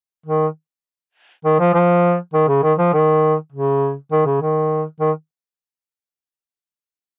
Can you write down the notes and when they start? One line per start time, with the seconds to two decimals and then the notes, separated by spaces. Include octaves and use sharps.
0.26 D#3
1.45 D#3
1.60 F3
1.74 F3
2.34 D#3
2.48 C#3
2.63 D#3
2.78 F3
2.93 D#3
3.52 C#3
4.12 D#3
4.26 C#3
4.41 D#3
5.00 D#3